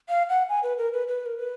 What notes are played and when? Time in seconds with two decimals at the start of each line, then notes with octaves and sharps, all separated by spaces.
0.09 F5
0.29 F#5
0.49 G#5
0.63 B4
0.78 A#4
0.93 B4
1.08 B4
1.26 A#4
1.38 B4